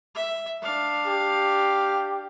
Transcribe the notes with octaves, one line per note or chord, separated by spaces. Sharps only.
E5
D4 F5
G4